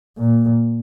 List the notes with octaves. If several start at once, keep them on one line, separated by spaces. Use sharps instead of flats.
A#2